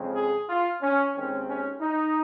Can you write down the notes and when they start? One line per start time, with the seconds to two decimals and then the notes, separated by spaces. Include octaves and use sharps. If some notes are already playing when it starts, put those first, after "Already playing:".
Already playing: F2 C#3 G#3 C4
0.16 G#4
0.49 F4
0.81 C#4
1.15 D#2 D#3 G#3 C4 C#4
1.48 C#4
1.81 D#4